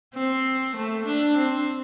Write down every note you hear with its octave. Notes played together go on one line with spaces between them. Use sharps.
C4
A3
D4
C4